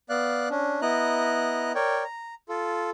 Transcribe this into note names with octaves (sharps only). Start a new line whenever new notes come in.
B3 D5 F5 F#6
C#4 D4
B3 E4 D#5 A#5 F#6
A#4 C#5 D5 G5
A#5
F4 A4